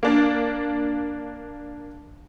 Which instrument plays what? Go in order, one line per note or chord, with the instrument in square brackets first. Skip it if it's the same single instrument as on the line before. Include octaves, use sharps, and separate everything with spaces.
[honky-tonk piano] A#3 D4